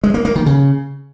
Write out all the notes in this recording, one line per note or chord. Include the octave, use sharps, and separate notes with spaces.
G#3
A#3
A#3
D#3
C#3